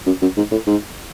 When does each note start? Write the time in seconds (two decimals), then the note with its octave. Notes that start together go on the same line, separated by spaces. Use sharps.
0.06 F#2
0.22 F#2
0.37 G#2
0.51 A2
0.67 G#2